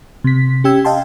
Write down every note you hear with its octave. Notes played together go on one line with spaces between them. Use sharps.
C3 B6
C#4 G4 G5 E6 G#6
D#5 F5 G5 A5 C6